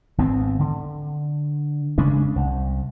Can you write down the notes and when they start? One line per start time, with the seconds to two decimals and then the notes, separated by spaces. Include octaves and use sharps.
0.18 G#1 B3 C4
0.59 D3
1.98 C#3 G#3 C#4 D4
2.36 C2